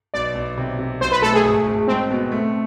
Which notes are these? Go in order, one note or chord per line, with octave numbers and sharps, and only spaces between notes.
B1 D5
B1
C3
C3
B1 C5
B4
A3 A4
G#4
G#1
G#1
G#3 C4
B2
A3